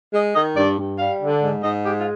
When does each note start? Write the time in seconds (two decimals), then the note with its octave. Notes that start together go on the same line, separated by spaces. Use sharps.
0.13 G#3 D#5
0.35 D#3 D#5
0.57 G2 D5
0.79 G2
0.99 G3 F5
1.20 D3
1.42 G#2
1.63 G#2 D#5
1.85 G#3 G4
2.00 F4